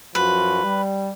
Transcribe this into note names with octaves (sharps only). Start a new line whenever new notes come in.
F#2 F3 F#4 B4
G3